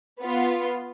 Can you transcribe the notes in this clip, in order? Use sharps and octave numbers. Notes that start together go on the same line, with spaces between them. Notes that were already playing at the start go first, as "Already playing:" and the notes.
B3 F4